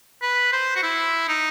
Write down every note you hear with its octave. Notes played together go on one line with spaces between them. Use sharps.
B4
C5
F#4
E4
D#4